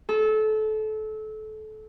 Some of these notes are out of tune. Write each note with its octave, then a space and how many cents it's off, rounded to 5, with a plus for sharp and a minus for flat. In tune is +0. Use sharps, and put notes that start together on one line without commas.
A4 -25